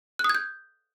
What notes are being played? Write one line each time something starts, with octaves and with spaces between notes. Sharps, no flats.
F#6
D#6
G#6
G6